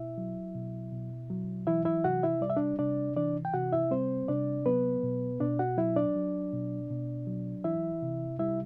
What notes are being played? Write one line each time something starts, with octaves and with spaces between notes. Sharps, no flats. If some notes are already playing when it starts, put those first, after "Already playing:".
Already playing: B2 E4 E5
F#3
B2
B2
F#3
E3 E4 E5
E4 E5
C3 F#4 F#5
E4 E5
G3 D5
E5
D4 D5
C3 D4 D5
E3 D4 D5
G5
C3 F#4 F#5
E4 E5
G3 C4 C5
C3 D4 D5
F#3 B3 B4
B2
B2 D4 D5
F#4 F#5
F#3 E4 E5
D4 D5
F#3
B2
B2
F#3
E3 E4 E5
C3
G3 E4 E5